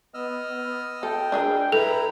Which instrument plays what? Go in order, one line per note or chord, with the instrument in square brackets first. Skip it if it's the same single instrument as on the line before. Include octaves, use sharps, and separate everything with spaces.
[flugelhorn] B3 [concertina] D#5 E6 F6
[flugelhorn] B3
[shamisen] A4 [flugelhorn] G5
[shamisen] D4 G#4 A#4
[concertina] E4 A#5 B5 [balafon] A4 [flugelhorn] B4